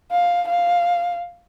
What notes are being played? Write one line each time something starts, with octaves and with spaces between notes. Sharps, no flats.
F5
F5